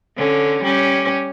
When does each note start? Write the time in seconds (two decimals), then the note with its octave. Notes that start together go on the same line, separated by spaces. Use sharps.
0.17 D3 C#4
0.63 G3 C#4 G4